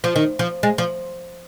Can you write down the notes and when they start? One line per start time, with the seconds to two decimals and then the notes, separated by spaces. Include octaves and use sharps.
0.04 F3
0.16 D#3
0.39 F3
0.63 G#3
0.78 F3